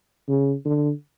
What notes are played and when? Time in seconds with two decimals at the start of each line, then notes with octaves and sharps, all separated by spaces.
0.28 C#3
0.65 D3